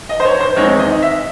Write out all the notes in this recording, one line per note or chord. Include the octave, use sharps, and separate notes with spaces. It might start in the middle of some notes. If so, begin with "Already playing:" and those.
D#5
C5
C#5
C5
E2 D#3 G#3 C4 D#4 C#5
D#5
E5